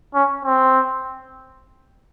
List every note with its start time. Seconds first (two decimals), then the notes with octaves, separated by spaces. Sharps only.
0.15 C#4
0.45 C4